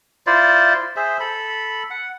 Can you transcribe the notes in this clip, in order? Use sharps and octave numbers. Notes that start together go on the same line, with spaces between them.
E4 F4 C5 D5
G#4 C5 E5
A4 B5
F#5